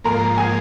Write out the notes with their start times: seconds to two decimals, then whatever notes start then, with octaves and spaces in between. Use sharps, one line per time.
0.04 G#2 F3 A#3 A#4 A#5
0.38 G#4 G#5